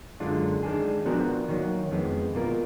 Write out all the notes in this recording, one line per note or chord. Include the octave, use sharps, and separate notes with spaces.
F#2 D3 G#3 D4 F4
D#3 G#3 D4 G#4
F3 B3 D4 F#4 A#4
D#3 F#3 A#3
F2 D#3 G#3 B3
B2 A#3 F4 A#4